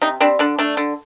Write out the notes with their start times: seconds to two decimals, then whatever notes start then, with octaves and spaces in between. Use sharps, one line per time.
0.02 C3 D#4
0.20 G3 C4 D4
0.39 D3 D4
0.58 A3 D4
0.77 D3